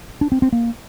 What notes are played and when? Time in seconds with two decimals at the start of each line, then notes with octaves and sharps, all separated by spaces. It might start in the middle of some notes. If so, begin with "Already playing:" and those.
0.21 D4
0.32 C4
0.42 C4
0.53 A#3